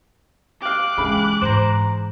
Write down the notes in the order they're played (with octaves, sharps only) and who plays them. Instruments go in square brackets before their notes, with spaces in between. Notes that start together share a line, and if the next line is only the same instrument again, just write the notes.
[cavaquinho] G4 F5 [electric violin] D6 F#6
[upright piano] C#3 B5 [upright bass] E3 G#3
[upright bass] G#2 E3 [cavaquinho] C5 A#5